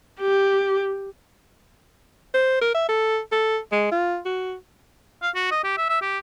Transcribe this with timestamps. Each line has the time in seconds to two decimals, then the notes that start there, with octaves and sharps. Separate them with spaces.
0.21 G4
2.34 C5
2.61 A#4
2.74 E5
2.89 A4
3.32 A4
3.72 G#3
3.92 F4
4.25 F#4
5.22 F5
5.35 F#4
5.51 D#5
5.64 G4
5.77 E5
5.90 E5
6.02 G4